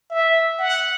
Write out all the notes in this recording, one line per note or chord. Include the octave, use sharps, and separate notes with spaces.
E5
F#5